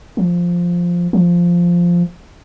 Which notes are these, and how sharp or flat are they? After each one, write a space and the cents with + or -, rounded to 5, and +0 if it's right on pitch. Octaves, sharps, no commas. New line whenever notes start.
F3 +0
F3 -5